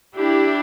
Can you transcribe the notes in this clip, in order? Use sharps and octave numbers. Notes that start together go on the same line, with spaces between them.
D4 E4 G4